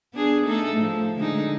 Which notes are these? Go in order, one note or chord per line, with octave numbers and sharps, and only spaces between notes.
B3 D4 G#4
A3 D#4 A4
A2 F3
D3 G#3 D#4